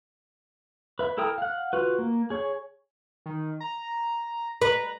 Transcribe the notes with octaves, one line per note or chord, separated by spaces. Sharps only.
B4 E5
E4 A4 A#4 G5 D#6
F5 F#5
F4 F#4 B4
A#3
G#4 C#5
D#3
A#5
B4 A#5